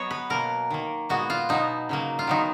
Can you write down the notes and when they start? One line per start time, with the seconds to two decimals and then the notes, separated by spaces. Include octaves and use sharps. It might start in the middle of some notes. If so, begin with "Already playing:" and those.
Already playing: F#3 B3 C#5 D#5
0.11 B4
0.30 B2 A#3 A#4
0.70 D#3 A#3
1.09 A#2 G#3 B3 F#4
1.30 F4
1.49 B2 F#3 B3 D#4
1.89 C#3 F#3 A#3
2.19 F4
2.27 D#3 F#3 B3 D#4